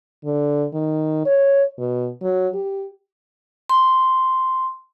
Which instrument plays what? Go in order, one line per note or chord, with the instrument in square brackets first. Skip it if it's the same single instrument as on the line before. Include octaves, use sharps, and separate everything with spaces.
[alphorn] D3
D#3
C#5
B2
F#3
G4
[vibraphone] C6